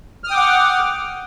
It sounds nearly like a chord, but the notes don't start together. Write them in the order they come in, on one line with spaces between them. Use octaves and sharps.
F6 D#6 G5 D6 F#5